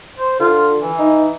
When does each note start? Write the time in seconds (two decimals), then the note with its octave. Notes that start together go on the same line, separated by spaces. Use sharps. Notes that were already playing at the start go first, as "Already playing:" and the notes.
0.19 C5
0.40 D3 F4
0.80 E3
0.99 D#4